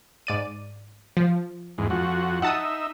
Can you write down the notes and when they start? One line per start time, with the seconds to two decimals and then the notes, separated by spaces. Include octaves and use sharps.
0.27 G#2 D5 D#7
1.17 F3
1.78 E2 G#2
1.90 F2 F#4
2.42 D#4 E5 F#5 A5 D#6